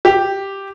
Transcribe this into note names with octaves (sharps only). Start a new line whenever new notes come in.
G4